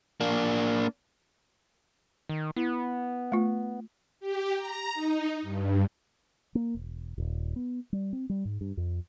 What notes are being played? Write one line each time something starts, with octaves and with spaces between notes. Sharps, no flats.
A#3 D4
D#3
B3 E4
A3 F4
G4
A#5
D#4
G2
A#3
E1
D#1
B3
G3
C4
G3
G#2
G2
F2